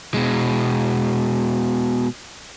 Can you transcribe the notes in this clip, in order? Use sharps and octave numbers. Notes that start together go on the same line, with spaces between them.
B2 G#3